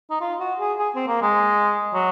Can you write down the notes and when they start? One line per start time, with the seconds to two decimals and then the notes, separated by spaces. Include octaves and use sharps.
0.11 D#4
0.21 F4
0.40 F#4
0.60 G#4
0.79 G#4
0.96 C4
1.08 A#3
1.22 G#3
1.94 F#3